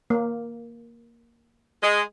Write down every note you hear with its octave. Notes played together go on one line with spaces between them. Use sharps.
A#3
G#3